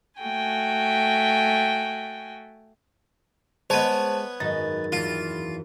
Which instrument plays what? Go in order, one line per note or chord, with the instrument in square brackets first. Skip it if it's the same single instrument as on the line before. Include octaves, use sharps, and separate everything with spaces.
[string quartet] A3 F#4 G5 G#5
[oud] G#3 [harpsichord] B3 C#5 [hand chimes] C5 A5
[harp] G#1 F#2 A#6 [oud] D#4 [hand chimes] A6
[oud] E2 E3 [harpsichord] F4